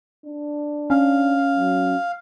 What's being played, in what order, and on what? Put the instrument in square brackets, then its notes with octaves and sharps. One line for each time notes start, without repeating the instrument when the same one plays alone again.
[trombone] D4
[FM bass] C#4 [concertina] F5
[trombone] F#3